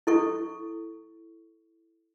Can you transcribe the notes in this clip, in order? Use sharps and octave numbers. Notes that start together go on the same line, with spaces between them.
E4 A4 C#6